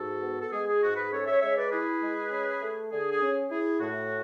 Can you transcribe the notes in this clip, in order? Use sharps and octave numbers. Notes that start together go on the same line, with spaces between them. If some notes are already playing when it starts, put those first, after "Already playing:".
Already playing: G#2 F#4 A4
B3
A4
G#3 G#4
G#4
G#2 F#4
G#4 B4
C#4 A4 C#5
C#5 E5
G#3 C#5 E5
B4 D5
E4 G#4 B4
G#3
C#4
A3
D3 G#4
G#4
C#4
E4 G#4
A2 F#4